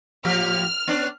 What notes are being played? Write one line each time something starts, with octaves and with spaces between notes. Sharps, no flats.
A2 F3 G4 F6
B3 C#4 D4